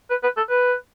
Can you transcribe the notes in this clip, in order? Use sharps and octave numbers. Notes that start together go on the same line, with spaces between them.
B4
B4
A4
B4